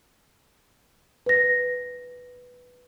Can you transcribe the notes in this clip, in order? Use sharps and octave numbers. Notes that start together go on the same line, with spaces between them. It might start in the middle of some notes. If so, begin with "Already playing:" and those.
B4 A#6